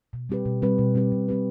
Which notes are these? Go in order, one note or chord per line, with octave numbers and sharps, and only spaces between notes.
B2
G3 C4 G4 B4
B2
G3 C4 G4 B4
B2
G3 C4 G4 B4
B2
G3 C4 G4 B4